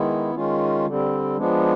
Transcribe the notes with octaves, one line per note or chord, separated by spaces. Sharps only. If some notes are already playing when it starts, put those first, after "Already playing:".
Already playing: D#3 G#3 B3 E4
D#3 G#3 C#4 F4
D3 G3 C4
F3 G#3 B3 D4